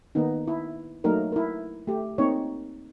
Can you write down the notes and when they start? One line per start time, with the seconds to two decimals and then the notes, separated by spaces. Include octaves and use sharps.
0.15 D#3 A#3 B3 D#4
0.48 E4
1.04 F#3 A3 A#3 D#4 A#4
1.32 E4 A#4
1.87 A3 G4
2.18 A#3 C4 D#4 C#5